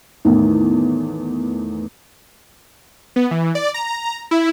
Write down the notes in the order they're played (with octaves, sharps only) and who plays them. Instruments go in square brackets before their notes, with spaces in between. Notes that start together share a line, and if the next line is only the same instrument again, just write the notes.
[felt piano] E2 A2 D#3
[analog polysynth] B3
E3
D5
A#5
E4